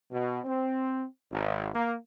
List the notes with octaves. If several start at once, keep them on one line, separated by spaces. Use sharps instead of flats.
B2
C4
G#1
A#3